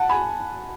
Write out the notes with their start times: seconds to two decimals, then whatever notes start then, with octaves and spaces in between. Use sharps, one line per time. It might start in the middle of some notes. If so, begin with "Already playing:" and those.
Already playing: F#5 A5
0.09 G#5 B5